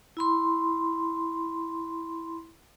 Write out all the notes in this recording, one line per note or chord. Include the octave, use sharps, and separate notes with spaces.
E4 B5 C6